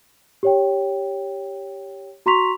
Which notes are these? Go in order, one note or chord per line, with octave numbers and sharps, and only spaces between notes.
G4 C#5 G5
F#4 A#5 C6 C#6 B6 F7